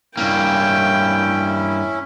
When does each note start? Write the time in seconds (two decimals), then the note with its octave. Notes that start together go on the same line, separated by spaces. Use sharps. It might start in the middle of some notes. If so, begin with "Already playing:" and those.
0.17 G2 A#3 C#4 E4 G5